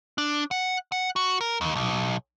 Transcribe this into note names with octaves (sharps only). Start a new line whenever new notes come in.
D4
F#5
F#5
F#4
A#4
D#2
B1